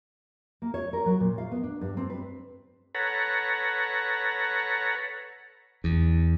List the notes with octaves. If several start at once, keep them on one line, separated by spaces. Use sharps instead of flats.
A#3
C#5
A#4
F#3
A#2
F5
B3
D4
G2
C4
B4
A4 B4 C#5 F#5 A#5
E2